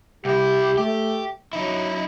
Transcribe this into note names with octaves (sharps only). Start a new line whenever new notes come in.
C2 E4 G4
A3 G4
F#3 D#4 E4